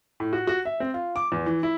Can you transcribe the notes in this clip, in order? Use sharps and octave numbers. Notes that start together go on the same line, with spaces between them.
A2
F#4
F#4
E5
C4
F4
D6
E2
E3
E4